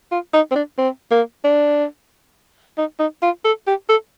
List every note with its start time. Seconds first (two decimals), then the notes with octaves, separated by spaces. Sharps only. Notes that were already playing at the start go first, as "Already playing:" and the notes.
0.12 F4
0.34 D#4
0.52 C4
0.55 D4
0.78 C4
1.11 A#3
1.45 D4
2.78 D#4
3.00 D#4
3.23 F4
3.45 A4
3.67 G4
3.89 A4